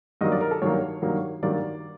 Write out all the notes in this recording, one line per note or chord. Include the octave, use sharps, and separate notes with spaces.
G2 D#3 F#3 A#3 D#5
D5
A#4
A4
G2 D#3 F#3 A#3 C#5
G2 D#3 F#3 A#3
G2 D#3 F#3 A#3 D5